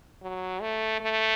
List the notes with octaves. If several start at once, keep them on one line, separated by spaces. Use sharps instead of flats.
F#3
A3
A3